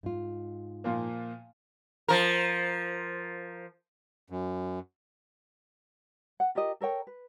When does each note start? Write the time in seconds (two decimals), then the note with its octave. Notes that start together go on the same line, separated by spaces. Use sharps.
0.03 G#2 F4
0.84 A#2 F3 A#3
2.08 F3 A#4
4.30 F#2
6.40 F#5
6.55 F4 G4 A#4 D#5
6.81 A4 A#4 C#5 G5
7.07 B4